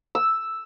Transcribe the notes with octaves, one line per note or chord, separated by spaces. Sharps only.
E6